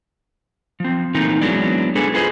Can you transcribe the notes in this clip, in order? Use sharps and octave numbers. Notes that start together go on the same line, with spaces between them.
F3 C4
E3 A3 A#3 C4 D#4
F#3 G#3 B3 D4 E4 D5
G#3 D4 G#4 A4 B4
F4 G#4 B4 C5 D#5